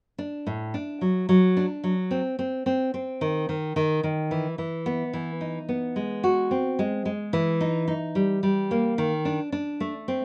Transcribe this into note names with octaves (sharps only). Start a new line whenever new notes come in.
D4
A2
D4
F#3
F#3
D4
F#3
C4
C4
C4
C4
D#3
D#3
D#3
D#3
E3
E3
B3
E3
D#4
B3
G#3
F#4
C4
G#3
G#3
E3
D#4
D#4
G3
G3
A#3
D#3
D4
D4
A3
C4